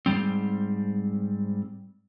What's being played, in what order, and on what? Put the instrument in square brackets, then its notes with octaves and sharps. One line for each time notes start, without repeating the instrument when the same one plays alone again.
[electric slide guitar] G#2 C#3 G3 C4